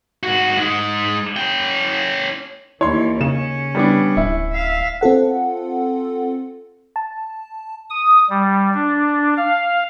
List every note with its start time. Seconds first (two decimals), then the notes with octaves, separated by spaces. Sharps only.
0.23 G#2 F#4
0.57 G#2 G#3
1.37 C#4 G5
2.81 D#2 E3 E4 C#5 C6
3.21 C#3 C#4 E7
3.75 G3 B3 D4
4.17 D1 E4
4.53 E5 F5
5.01 C4 F4 A4 F#5
6.96 A5
7.90 D#6
8.30 G3
8.74 D4
9.37 F5